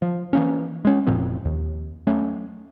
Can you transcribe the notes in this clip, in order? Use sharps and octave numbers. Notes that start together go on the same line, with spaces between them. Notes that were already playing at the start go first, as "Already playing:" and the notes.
F3
E3 A#3 C#4
G#3 C#4
F1 A#2 F3 C4
D#2
F#3 A3 C#4